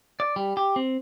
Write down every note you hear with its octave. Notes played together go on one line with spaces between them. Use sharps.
D5
G3
G4
C4